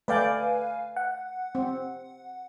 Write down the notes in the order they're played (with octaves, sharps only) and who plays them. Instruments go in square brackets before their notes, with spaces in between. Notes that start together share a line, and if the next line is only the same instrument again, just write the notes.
[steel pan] A3 D5 G5 [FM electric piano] B4 F5 G#5
[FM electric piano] F#5
[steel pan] C4